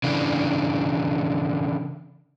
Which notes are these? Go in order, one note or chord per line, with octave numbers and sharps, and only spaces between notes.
C#3 E3 D4